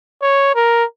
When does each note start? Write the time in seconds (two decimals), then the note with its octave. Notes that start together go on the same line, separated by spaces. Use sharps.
0.22 C#5
0.55 A#4